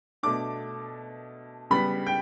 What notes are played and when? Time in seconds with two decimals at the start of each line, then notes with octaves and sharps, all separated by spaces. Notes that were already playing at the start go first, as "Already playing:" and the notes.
0.23 B2 A3 D4 D6
1.70 C#3 G3 B3 B5
2.06 G5